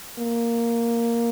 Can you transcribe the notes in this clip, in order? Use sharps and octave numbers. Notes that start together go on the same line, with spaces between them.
A#3